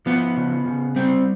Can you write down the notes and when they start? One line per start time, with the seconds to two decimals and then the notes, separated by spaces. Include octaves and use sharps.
0.06 F3 B3
0.37 C#3
0.66 C#3
0.96 G3 C4